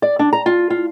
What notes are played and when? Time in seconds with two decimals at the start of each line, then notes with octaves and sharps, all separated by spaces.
0.02 D5
0.19 D4
0.33 A#5
0.46 F4
0.70 F4